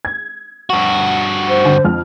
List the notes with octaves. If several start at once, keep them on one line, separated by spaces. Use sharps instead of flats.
G#6
G2 F#4
C5
D3
F2 F6